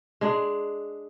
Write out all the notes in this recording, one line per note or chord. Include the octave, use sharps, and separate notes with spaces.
G#3 D4 G#4